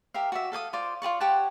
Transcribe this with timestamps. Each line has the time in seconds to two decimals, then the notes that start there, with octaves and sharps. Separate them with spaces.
0.14 G4 A#4 E5 F5
0.32 F#4 D5 E5
0.52 A4 F5 G#5 D#6
0.73 F4 C5 D5
1.02 F4 G#4 D5 C#6
1.20 G4 C#5 F#5 A5